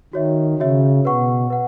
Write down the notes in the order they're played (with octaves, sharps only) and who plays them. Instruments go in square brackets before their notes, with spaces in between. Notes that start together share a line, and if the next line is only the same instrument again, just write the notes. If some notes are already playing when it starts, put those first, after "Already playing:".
[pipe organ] D#3 [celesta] F#4 C#5 E5
[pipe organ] C#3 [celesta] F#4 C#5 E5
[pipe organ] B2 [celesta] B4 F#5 C#6
[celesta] B4 F#5